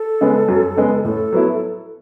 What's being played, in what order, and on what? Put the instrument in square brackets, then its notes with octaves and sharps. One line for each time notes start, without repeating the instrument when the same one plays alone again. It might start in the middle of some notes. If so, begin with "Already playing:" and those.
Already playing: [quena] A4
[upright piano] C#3 G#3 B3
F#2
C#3 G#3 B3
[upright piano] A2 [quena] A4
[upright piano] F#3 B3 E4